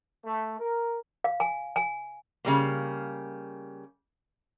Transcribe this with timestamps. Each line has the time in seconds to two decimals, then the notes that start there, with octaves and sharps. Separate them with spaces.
0.25 A3
0.60 A#4
1.24 F5
1.40 G#5
1.76 G#5
2.45 C#3 G3 A#3